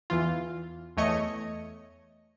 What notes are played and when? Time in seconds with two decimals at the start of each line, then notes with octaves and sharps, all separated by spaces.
0.10 E2 E3 F4
0.97 E2 A3 C#5 D#5 C#7